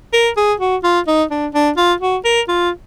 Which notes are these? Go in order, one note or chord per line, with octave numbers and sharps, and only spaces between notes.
A#4
G#4
F#4
F4
D#4
D4
D4
F4
F#4
A#4
F4